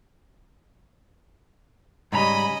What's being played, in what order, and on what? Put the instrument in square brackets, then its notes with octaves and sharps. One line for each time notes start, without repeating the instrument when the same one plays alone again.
[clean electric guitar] G#2 C#3 A#5 [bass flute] G3 [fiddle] C#4 D#5 [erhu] B5